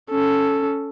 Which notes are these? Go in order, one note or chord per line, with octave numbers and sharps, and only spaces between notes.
C#4 A4